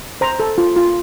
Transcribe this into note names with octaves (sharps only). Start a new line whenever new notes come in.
C5 A#5
A4
F4
F4